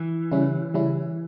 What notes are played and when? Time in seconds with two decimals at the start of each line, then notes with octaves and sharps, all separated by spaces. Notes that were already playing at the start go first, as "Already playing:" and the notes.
Already playing: E3
0.31 C#3 G3 C#4 E4
0.74 C#3 G3 C#4 E4